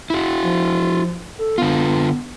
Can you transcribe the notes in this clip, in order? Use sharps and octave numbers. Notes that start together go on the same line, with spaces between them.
E4 F#4
F3
A4
D3 B3 F4